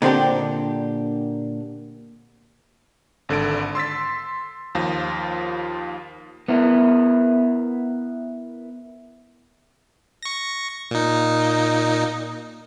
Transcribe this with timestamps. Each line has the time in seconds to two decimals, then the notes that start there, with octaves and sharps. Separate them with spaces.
0.02 A#2 D3 C4 D4 G4
3.29 G#1 D3 A4 D7
3.75 C6 E6 A6 B6
4.75 D#2 F3 F4 A#6
6.48 B3 E4 A#4
10.23 C#6 A#6
10.91 A#2 D#4